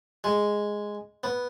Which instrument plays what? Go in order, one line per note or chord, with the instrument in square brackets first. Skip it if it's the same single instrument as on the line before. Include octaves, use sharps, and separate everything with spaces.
[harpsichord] G#3
B3